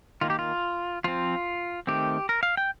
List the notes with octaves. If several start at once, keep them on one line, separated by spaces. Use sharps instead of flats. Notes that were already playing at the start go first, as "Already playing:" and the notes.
D#3 A#3 F4
G4
F4
F3 C4 F4
D#3 A3 C4 G4
A#4
F5
G5